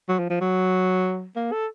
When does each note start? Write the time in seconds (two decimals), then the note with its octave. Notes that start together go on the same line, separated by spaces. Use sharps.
0.09 F#3
0.19 F3
0.30 F3
0.41 F#3
1.36 A#3
1.52 A4